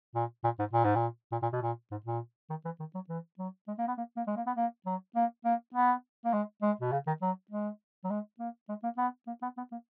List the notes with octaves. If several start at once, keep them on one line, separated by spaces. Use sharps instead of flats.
A#2
A#2
G#2
A#2
G#2
A#2
A#2
A#2
B2
A#2
G#2
A#2
D#3
E3
D#3
F#3
E3
F#3
G#3
A#3
B3
A#3
A#3
G#3
A#3
B3
A#3
F#3
A#3
A#3
B3
A#3
G#3
G#3
B2
C#3
D#3
F#3
G#3
F#3
G#3
A#3
G#3
A#3
B3
A#3
B3
B3
A#3